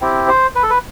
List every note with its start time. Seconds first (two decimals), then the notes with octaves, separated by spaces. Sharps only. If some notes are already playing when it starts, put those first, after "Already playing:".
0.01 C4 E4 G4
0.28 C5
0.55 B4
0.63 A4
0.70 B4